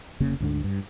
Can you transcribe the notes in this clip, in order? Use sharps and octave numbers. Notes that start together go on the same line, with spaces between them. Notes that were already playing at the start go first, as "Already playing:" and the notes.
F1 C#3 A#3
D2 G#2 B2 D3
G2